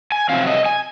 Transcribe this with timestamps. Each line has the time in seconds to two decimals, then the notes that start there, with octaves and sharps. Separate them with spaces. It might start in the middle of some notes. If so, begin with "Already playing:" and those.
0.12 G#5
0.29 C3 F#3 C4 F5
0.47 D#5
0.65 G#5